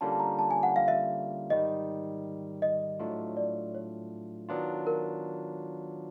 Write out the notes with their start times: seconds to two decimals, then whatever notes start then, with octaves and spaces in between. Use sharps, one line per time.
0.01 D3 G3 A#3 C#4 F4 A5
0.12 A5
0.20 A#5
0.39 A5
0.51 G#5
0.63 F#5
0.76 F5
0.88 E5
1.50 G#2 D#3 G3 D#5
2.62 D#5
2.99 A2 F#3 A3 D4 F4
3.37 D5
3.75 C#5
4.48 D#3 F#3 B3 D4 F4
4.87 A#4